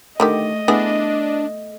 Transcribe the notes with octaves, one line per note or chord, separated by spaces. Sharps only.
D3 D#3 A3 G4 D#5
A3 B3 D4 E4 G#4